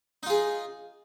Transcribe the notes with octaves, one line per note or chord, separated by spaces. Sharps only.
D#4 F4 G#4